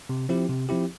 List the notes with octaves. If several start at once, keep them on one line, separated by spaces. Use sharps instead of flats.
C3
F3 C4 E4 G4
C3
F3 C4 E4 G4